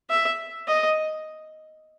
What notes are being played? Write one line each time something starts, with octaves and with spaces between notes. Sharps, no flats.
E5
D#5